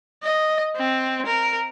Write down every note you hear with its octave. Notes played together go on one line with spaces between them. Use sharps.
D#5
C4
A#4